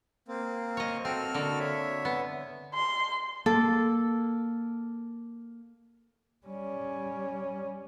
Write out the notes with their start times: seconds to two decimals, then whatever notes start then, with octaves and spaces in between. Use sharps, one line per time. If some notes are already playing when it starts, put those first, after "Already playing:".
0.28 A#3 C4
0.77 C#5 D#5
1.05 C4 F#4 A4 F6
1.34 D3 A#3
1.59 C#5 E5
2.05 B3
2.75 C6
3.46 A#3 A4
6.46 G3 C#4